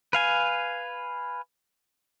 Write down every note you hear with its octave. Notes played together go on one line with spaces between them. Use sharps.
B4 F5 G#5